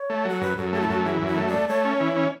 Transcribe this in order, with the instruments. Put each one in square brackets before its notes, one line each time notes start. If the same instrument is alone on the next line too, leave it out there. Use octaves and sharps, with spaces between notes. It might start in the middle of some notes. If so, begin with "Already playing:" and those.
Already playing: [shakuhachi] C#5
[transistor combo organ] A3
[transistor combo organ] F#3 [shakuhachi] A4
[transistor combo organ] F#2 [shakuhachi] B4
[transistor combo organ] F#2 [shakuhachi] A4
[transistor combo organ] A3 [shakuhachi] G#4
[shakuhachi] E4
[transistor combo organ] F#2 [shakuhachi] F#4
[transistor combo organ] E3 [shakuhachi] G#4
[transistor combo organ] F#2 [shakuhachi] E5
[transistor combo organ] A3
[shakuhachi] D5
[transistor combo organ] A3
[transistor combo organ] A3 [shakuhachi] C#5
[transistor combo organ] C#4
E3
C#4